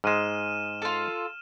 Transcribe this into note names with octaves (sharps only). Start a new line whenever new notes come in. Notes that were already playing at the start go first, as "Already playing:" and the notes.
G#2 G#3 F6 D#7 E7
F4 A4